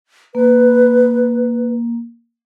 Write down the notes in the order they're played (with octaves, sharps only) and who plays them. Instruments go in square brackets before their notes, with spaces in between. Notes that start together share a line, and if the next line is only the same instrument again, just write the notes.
[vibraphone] A#3 [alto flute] B4